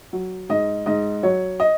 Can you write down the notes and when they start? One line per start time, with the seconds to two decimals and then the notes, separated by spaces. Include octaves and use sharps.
0.13 F#3
0.49 G#2 D#5
0.86 G#2 D#5
1.23 F#3 C#5
1.60 D#5